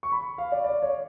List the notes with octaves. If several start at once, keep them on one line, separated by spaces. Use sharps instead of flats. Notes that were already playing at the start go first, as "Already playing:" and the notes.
C#6
B5
F5
D5
D5
C#5